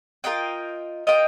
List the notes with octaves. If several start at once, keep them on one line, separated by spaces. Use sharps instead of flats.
F4 A#4 D#5 G5
F4 A#4 D#5 G5